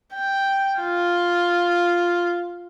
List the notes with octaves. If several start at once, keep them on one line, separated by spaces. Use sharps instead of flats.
G5
F4